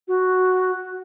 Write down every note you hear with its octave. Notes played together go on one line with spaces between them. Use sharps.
F#4